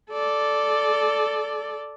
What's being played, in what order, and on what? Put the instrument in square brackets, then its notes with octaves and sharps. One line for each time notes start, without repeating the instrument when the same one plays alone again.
[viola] A4 D5